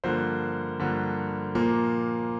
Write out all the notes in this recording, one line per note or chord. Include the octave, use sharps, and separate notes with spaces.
G2 D3 F3 A#3 C5
G2 D3 F3 A#3
A#2 F3 A#3